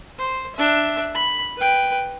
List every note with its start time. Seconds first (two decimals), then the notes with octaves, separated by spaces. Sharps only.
0.18 C5
0.56 D4 E5
1.15 B5
1.57 B4 G5